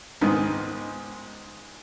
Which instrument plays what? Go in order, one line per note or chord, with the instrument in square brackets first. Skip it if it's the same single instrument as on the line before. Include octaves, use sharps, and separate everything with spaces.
[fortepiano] C#2 G#2 D#3 B3